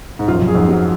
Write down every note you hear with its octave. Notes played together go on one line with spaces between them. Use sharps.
G#2
F#2 F4
F2
F#2
G#4
F2 G#2
F#3